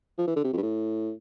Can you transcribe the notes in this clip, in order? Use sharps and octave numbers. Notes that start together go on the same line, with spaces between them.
F3
E3
D3
C3
F2
G2
A2